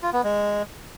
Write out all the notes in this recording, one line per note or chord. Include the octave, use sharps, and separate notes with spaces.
F4
B3
G#3